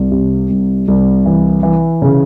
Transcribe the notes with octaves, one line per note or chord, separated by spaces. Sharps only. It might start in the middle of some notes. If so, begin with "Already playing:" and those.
Already playing: C2
C3
C2
C2
E3
E3
C#3